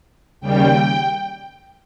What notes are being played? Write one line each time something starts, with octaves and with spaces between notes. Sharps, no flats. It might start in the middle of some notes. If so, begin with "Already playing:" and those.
D#2 C#3 G3 G5